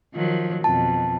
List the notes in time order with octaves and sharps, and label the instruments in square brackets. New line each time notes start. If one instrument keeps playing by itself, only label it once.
[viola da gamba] D#3 F3 F#3
[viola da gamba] F2 B2 [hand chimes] A5